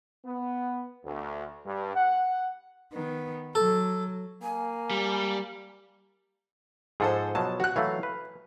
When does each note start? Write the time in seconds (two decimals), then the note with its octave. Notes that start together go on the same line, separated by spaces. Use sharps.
0.23 B3
1.05 D2
1.65 G2
1.95 F#5
2.93 D#3 B3
3.55 F#3 A4
4.43 A#3 G#5
4.91 G3
7.00 G#2 F3 G#3 G#4 A4 C5
7.35 B2 F3 F#3 A5
7.60 F#4 F#6
7.76 E3 F#3 A3 F5
8.03 B4